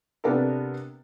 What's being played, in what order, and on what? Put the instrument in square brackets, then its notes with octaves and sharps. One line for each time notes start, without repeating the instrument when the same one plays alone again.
[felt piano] C3 B3 D4 G4 A4 A#4